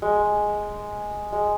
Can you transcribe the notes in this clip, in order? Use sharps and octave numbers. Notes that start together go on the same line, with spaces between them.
G#3
G#3